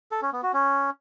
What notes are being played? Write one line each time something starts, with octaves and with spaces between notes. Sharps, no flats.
A4
C#4
B3
F#4
C#4